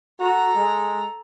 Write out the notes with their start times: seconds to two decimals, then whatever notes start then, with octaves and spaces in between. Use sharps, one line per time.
0.20 F#4 A4 A#5
0.56 G#3